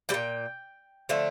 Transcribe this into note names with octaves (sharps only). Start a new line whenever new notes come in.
G3 G5
A#2
D3 F3 A3